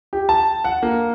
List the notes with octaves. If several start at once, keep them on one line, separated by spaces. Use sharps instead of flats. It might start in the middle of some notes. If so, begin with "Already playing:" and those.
G4
A5
F#5
A#3